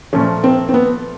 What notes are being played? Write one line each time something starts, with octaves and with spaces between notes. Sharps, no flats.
A#2 F3 A3 C#4
C4
C4
B3